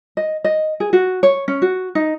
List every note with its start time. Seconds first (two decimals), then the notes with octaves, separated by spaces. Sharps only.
0.17 D#5
0.44 D#5
0.80 G#4
0.93 F#4
1.23 C#5
1.48 C#4
1.62 F#4
1.95 D#4